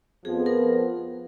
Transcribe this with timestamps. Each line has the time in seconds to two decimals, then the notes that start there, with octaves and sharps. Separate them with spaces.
0.25 F2 F3 B3 G#4
0.46 A#4